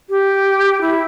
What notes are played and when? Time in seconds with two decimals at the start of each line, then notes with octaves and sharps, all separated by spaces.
0.10 G4
0.81 E4